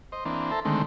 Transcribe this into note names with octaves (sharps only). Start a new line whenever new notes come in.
C5 D#5
E3 A#3 C4 D4
A4 C5 E5 A5 A#5
D3 D#3 G#3 A3 C4